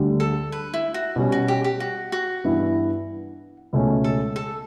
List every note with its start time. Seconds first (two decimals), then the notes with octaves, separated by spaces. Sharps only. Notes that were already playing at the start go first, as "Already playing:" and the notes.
Already playing: D2 D3 G3
0.20 A4
0.52 B4
0.74 E4
0.94 F#4
1.16 B2 G3 C#4
1.32 F#4
1.48 G4
1.64 G4
1.80 F#4
2.12 F#4
2.44 G2 E3 B3 E4
3.73 C#2 B2 A3 C#4
4.04 A4
4.36 A4